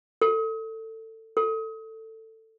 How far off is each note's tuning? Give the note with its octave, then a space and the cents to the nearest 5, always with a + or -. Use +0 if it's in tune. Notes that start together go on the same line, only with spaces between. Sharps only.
A4 +20
A4 +15